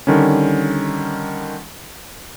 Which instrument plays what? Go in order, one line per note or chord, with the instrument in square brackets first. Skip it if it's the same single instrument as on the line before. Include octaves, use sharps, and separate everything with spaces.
[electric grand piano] D3 D#3 G3 C#4